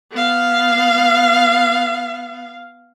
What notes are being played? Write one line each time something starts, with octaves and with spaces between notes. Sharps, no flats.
B3 F5